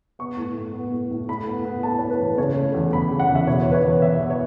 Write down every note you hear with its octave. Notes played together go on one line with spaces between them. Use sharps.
B3 C#6
A2
A2
B3
A2
A2
A2 B5
B3
B3
A2 A5
A2 C#5
B4
E3
C#3 C#5
A3
E2
E2 B5
C#3
F#5
E2
E5
B2 C#5
E2
B4
C#5
E2
E2 E5
B3
C#5